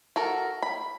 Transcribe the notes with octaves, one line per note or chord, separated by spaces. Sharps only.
F#4 A4 A#4
B5